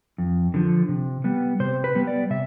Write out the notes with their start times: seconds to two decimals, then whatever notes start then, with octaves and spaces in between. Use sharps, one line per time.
0.18 F2
0.54 D3 F3
0.88 C3
1.24 G3 B3
1.60 C3 C5
1.84 B4
1.95 G3 B3
2.07 D5
2.30 C3 E5